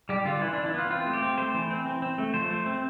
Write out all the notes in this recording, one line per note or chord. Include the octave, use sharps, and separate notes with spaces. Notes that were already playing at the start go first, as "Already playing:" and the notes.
G3 G4
D3 F4
E3 E4
E3 D4
E4
B3 F4
C4 F4
A3
G4
C4
A3 C5
E3
C4
C4
C4
A3
F3 C5
A3
C4